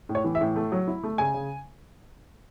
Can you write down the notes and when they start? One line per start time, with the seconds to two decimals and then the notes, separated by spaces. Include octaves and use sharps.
0.09 A2
0.15 C#5
0.24 E3
0.35 E5
0.41 A2
0.56 A3
0.72 F#3
0.88 E4
1.03 A3
1.18 C#3 G#5
1.34 C#3